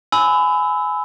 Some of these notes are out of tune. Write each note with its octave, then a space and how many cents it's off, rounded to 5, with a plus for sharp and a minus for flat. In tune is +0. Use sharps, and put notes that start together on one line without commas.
G#5 +15 B5 +25 E6 -15